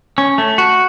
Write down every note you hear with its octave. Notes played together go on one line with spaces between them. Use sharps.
C#4
A3
F#4